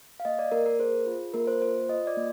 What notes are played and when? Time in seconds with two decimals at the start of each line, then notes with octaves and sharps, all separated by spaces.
0.20 F5
0.25 A#3 D#5
0.39 D5
0.52 A#3 A#4
0.66 A#4
0.79 G#4 C5
1.07 F4
1.34 A#3 A#4
1.47 C5
1.62 F4 C5
1.89 F4 D#5
2.07 D5
2.17 A#3